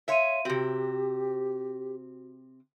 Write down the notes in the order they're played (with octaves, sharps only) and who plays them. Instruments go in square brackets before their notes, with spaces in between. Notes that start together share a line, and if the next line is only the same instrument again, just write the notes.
[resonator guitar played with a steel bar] C#5 E5 [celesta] F5 C6 D#7
[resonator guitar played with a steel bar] C3 C4 [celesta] F#4 [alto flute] G4